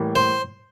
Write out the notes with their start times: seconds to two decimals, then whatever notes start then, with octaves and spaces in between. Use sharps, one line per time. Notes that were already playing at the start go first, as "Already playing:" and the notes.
Already playing: A2 E3 G3 A#3
0.16 C5